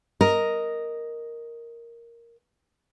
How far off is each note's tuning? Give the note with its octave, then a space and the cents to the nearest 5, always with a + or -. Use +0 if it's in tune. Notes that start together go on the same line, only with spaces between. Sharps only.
A#4 +0 D#5 +0